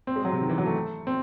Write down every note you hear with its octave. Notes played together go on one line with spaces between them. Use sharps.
C4
G#3
F#3
C3
D#3
E3
F#3
A3
C4